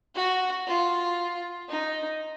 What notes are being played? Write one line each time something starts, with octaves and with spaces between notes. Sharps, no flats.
F#4
F4
D#4